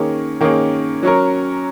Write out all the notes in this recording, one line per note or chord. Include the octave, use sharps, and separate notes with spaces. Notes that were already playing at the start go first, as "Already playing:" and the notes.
Already playing: D#3 A#3 C#4 G#4
D#3 A#3 C#4 G#4
F#3 C#4 A#4